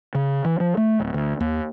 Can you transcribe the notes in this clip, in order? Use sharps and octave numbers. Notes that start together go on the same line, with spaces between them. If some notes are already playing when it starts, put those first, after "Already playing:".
C#3
E3
F3
A3
D1
D2
D#2